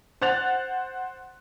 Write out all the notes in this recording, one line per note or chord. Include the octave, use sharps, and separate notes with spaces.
C5 F#5 F#6 A6 F7